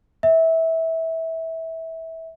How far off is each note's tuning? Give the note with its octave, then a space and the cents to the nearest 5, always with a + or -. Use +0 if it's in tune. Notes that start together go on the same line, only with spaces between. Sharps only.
E5 -20